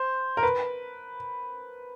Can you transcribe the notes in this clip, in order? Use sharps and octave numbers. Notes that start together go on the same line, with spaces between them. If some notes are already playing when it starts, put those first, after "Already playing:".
Already playing: C5
A#4
B4